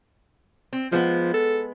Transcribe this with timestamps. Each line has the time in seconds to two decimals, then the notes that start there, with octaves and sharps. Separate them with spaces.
0.73 C4
0.92 F3 G#3 B3
1.34 A4